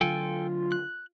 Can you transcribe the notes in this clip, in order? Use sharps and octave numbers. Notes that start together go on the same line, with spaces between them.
D3 F#3 F4 A4 G5 G#5
F#6